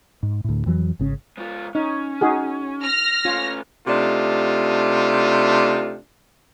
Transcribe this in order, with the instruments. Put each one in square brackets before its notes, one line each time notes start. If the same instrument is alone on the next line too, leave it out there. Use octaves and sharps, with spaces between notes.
[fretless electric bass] G#2
D2 A2
F2 E3 F#3
G#1 C#3 C#4
[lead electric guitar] G#2 F4
[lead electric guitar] C#4 [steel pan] D#4
[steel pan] D#4 F#4 G#4
[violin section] F6 A#6
[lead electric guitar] A3 C#4 [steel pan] F4
[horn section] C3 A3 D4 D#4 F4